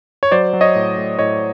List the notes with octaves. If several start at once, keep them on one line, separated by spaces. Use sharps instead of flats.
C#5
F#3 C5 D5
F#3
C#5 D#5
A2
A2
A2 C#5 D#5